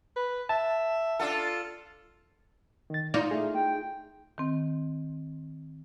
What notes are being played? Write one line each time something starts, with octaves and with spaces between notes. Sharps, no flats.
B4
E5 A5
D4 F4 A4
D#3 A6
D#4 F4 D5
A3 G#4
G5
D#3 C4